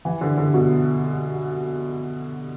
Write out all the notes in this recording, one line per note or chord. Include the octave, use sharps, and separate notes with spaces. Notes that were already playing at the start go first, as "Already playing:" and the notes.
E3
D3
D3
B2